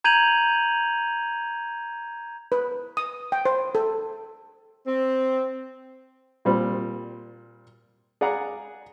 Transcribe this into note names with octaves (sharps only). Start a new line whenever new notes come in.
A#5 G6 G#6 D#7 F7 F#7
B4
D#6
G5
C5
A4
C4
A#2 G3 C4
G#4 D5 F5 F#5 A#5